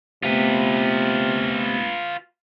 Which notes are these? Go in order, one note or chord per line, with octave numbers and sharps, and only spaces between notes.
C3 A3 B3 F4 B4